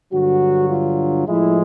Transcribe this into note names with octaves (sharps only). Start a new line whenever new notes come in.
G2 D3 F#3 F#4
F4
A2 F3 G#3 E4